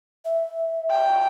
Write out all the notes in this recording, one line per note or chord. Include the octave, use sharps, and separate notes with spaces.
E5
G5